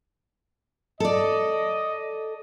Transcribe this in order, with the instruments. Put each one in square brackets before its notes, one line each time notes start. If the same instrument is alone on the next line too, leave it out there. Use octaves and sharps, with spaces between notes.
[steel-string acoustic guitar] A4 D5 [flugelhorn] D#5